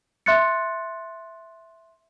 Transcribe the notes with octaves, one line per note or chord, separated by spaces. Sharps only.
E5 C6 F#6 A6 C#7